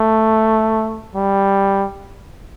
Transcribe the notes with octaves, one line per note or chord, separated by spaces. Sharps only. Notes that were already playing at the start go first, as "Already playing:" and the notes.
Already playing: A3
G3